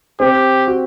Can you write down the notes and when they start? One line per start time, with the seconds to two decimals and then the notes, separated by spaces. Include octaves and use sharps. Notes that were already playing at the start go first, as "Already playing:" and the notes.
0.20 C4 G4
0.67 F#4